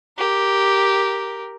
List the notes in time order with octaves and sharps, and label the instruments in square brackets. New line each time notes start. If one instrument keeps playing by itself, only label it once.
[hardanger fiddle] G4 A#4